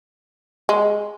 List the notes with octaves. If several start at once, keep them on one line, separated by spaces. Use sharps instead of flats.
G#3